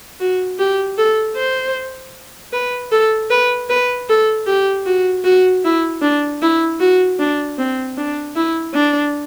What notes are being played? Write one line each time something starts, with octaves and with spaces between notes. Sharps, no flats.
F#4
G4
A4
C5
B4
A4
B4
B4
A4
G4
F#4
F#4
E4
D4
E4
F#4
D4
C4
D4
E4
D4